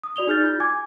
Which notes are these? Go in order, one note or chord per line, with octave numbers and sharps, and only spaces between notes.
D#6
F#4 D5 F7 G7
D#4 G#4 F6 G6 A6
F4 G6
G#5 D6 G#6